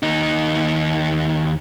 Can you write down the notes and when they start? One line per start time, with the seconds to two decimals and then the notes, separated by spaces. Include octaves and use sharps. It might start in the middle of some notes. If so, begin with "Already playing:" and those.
0.03 D#2 D#4